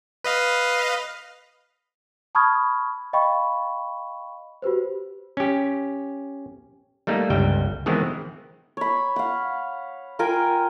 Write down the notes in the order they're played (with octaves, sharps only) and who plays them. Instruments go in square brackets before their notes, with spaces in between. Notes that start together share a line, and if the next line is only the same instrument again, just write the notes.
[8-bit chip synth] B4 D#5 F5
[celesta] A5 B5 C#6 D#6 F6 G#6
D#5 F5 G5 B5 C#6
F#4 G4 B4 C5
[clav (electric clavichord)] C#4 G4
G3 A3 A#3 D#4
G1 C#2 G3 G5
D#3 E3 G#3 B3 C4
[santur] C#5 B5
F5 F#5
F4 A#4 G5 G#5